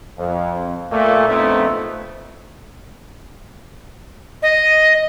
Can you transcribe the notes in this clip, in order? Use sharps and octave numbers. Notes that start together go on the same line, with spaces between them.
F2
A#2 A3 A#3
A#1 F2 A3 B3 C4 D#4
D#5